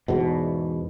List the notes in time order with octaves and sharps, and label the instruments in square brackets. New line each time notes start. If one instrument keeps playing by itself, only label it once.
[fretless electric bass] E2 G#2 B2